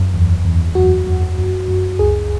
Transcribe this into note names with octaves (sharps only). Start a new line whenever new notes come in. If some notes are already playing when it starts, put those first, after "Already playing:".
Already playing: F#2
E2
E2
F#2 F#4
F#2
F#2
F#2
C#2 G#4